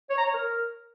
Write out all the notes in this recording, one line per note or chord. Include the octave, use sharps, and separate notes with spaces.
C#5
A#5
C#5
A#4